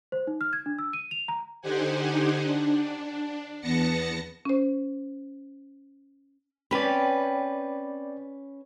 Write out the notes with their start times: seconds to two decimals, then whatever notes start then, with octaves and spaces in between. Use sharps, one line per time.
0.12 C5
0.27 D#4
0.41 F6
0.53 G#6
0.66 D4
0.79 E6
0.93 D#7
1.11 F7
1.28 A#5
1.62 D3 D#4 G4 C5 F#5 G#5
2.42 D4
3.61 E2 B3 A5 A#6 C#7
4.45 C#4 C5
6.71 C4 C#4 B4 D5 G5 B5